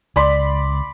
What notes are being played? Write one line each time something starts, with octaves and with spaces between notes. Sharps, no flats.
C#2 D5 B5 C6